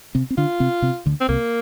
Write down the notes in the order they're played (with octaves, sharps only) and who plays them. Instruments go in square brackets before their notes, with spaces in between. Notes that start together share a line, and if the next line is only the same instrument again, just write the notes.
[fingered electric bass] C3 C4
C4
[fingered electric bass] D3 D4 [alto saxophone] F4
[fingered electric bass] C3 C4
C3 C4
D2 D3
[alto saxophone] C4
[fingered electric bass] C2 C3 [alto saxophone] A#3